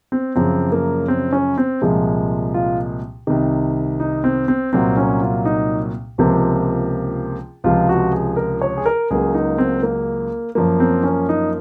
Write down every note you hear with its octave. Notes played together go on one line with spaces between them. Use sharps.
C4
F#2 C#3 F3 C4
A#3
C4
C#4
C4
C2 A#2 F3 G#3
F4
C2 C3 D#3
D#4
C4
C4
C2 A#2 F#3 C4
C#4
F4
D#4
C#2 C3 F3 A#3
C#2 C3 F3 F4
F#4
G#4
A#4
C#5
G#4
A#4
C#2 C#3 F#3 A#3 G#4
D#4
C4
A#3
F#2 F3 A#3
C4
C#4
D#4